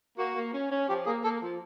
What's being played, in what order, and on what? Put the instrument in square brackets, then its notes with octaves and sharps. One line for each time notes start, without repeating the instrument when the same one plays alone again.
[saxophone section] A#3 [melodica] F#4
[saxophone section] A#3
C#4
C#4
[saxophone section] F3 [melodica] G4
[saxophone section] A#3 [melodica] G#4
[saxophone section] A#3 [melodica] A4
[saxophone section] F3